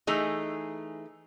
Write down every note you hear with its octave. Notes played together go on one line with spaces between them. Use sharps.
E3 A3 D#4 G#4